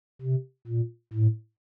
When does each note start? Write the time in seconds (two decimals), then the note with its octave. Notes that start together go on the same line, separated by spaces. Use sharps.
0.22 C3
0.67 A#2
1.14 A2